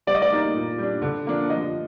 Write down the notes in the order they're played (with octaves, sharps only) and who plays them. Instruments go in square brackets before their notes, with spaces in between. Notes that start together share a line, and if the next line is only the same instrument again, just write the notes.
[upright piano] G3 [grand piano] D5
[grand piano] D#5
D5
[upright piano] A#3 D#4 A#4
A#2
G3 D4
D3
F3 A#3 D4
[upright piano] F3 [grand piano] D#5